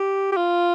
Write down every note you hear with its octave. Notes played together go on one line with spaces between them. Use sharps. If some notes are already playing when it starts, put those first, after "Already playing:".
Already playing: G4
G4
F4